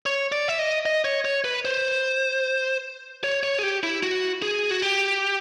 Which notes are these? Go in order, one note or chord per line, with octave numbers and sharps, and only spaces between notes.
C#5
D5
E5
D#5
D#5
C#5
C#5
B4
C5
C#5
C#5
G#4
G4
E4
F#4
G#4
F#4
G4